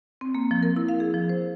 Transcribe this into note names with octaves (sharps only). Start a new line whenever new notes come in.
C4
A#3
F3
A#4
E4
F5
G#4
F3
C5